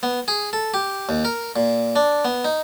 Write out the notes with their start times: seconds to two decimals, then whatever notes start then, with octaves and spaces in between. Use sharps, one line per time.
0.03 B3
0.28 G#4
0.53 A4
0.74 G4
1.09 D#2
1.25 A#4
1.56 A#2
1.96 D4
2.25 B3
2.45 D#4